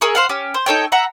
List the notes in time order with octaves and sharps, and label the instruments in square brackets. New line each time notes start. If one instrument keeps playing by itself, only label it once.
[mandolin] G#4 A#4 E5 C#6
C5 F5 F#5
C#4 G4
C5
D#4 A4 C#5 G5
E5 F#5 A#5